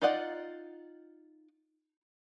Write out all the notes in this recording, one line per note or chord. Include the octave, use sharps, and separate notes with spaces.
D#4 F4 D5 D#5 F#5